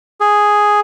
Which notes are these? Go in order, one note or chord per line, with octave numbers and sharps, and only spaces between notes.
G#4